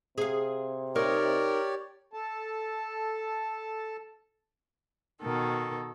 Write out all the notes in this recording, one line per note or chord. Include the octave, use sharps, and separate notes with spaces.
C3 G#4 F5
D#4 G4 A#4 C#5 D5
A4 A5
B2 D#3 A4